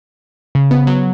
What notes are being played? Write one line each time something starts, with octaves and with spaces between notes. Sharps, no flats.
C#3
B3
F#3